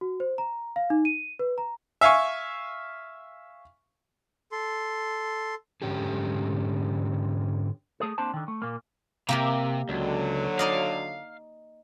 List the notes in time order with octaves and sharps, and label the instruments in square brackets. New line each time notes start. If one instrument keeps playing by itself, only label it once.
[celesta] F#4
C5
A#5
F5
D#4
D#7
B4
A#5
[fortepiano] E5 F5 G#5 C#6
[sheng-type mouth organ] A4 C6
[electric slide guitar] G#2 D3 C#4 G4 G#4
[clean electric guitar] A3 G#4 A4
A#3 C4 D4 C5 A5
D3 D#3
A3
A#2 A#3
[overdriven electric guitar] C3 [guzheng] A#3 G4 A#4
[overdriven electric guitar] C#2 [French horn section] D3 F#3
[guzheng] D#4 D5 D#5 [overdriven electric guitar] F5